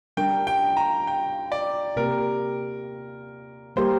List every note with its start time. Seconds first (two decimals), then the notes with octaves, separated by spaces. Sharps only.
0.17 G3 D4 A#4 G5
0.47 G5
0.77 A#5
1.07 G5
1.52 D5
1.97 C3 A#3 G4 A#4
3.76 G3 A#3 G4 A#4 C5